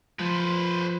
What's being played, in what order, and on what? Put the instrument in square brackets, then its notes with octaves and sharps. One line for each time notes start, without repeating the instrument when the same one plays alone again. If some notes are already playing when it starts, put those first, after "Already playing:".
[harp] F3 [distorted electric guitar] B4 C5